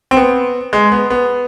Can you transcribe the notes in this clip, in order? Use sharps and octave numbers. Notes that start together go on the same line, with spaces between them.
C4
B3
G#3
B3
B3